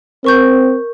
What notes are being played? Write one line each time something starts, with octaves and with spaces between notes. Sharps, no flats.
C4 A#4 C#6 G6